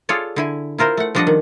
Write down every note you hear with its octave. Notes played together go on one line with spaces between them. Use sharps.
F4 G#4 A4 C#5 D5
D3 E4 G#5
E4 F4 A#4 C5
A3 F#5
F3 G3 D4 D5 D#5 F#5
D#3